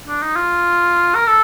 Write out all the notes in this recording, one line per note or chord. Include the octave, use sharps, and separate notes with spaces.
D4
D#4
F4
A#4
A4